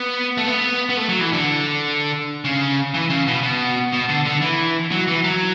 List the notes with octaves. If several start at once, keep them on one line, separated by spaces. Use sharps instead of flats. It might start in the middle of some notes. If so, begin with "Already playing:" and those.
Already playing: B3
A3
B3
B3
A3
F#3
E3
D3
C#3
E3
C#3
B2
B2
B2
D3
D3
E3
F#3
E3
F#3